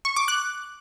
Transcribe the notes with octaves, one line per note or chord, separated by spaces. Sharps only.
C#6
D6
F#6